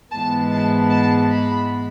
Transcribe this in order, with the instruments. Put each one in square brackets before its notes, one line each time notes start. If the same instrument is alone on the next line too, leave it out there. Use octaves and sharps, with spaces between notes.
[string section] G#2 E3 G#3 B3 A5
A5
A5
B5